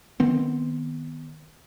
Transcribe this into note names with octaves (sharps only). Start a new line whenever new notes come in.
D#3 B3 C4